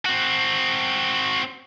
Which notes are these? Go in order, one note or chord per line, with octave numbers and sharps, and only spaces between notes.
C4 F#4